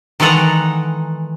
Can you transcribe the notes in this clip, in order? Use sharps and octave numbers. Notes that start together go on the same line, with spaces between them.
D#3 E3 G#3 A4 F#5 A#5